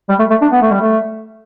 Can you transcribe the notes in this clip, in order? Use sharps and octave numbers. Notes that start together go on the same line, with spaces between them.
G3
A3
A3
D4
B3
A3
G3
A3